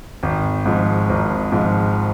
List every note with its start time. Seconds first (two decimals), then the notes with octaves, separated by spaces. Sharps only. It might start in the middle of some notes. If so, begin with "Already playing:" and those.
0.23 G#1
0.66 G#2 F3
1.09 G#1
1.52 G#2 F3